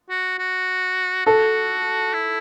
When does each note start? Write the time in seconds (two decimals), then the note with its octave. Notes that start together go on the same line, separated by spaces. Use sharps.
0.10 F#4
0.39 F#4
1.26 F#4 A4
2.14 E4